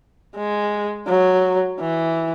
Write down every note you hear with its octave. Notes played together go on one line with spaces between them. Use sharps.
G#3
F#3
E3